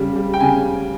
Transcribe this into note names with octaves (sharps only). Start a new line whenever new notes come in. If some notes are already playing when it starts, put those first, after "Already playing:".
Already playing: C#3 G3
G3
G5
C#3 G#5